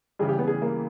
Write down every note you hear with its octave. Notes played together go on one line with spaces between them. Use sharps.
C#3 E3 G3 G#4
G4
B3
G#4
A#3